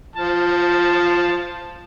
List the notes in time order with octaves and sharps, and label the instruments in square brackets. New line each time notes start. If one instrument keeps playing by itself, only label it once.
[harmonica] F3 A5